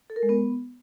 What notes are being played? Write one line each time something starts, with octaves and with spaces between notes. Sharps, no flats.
A4
A#4
G#3
B3